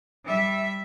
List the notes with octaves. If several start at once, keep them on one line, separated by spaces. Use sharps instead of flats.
G3 E5